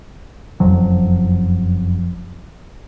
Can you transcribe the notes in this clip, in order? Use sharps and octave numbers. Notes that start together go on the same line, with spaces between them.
F#1 F2 F3 F#3